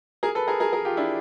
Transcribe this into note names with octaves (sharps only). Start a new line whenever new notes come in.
G#4 A#4
A4 B4
G#4 A#4
G#4 A#4
G#4 A#4
F4 G4
D4 E4